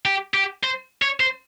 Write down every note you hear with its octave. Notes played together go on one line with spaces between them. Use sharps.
G4
G4
C5
C#5
C5